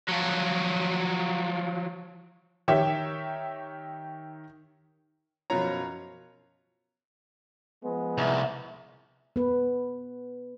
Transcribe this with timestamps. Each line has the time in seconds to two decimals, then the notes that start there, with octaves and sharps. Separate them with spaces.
0.09 F3 F#3
2.68 D#3 G4 C#5 E5
5.50 F#2 B2 F3 F4 C#5 A#5
7.84 F3 G#3 B3
8.18 C2
9.36 B3 B4